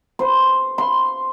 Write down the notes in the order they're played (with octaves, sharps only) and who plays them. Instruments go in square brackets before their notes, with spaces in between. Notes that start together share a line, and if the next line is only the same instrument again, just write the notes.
[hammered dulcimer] C5
C6